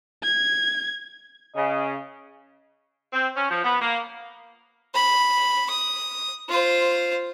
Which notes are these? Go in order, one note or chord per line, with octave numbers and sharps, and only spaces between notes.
G#6
C#3 D#5
C4
C#4
F3
B3
A#3
B5
D#6
F4 C5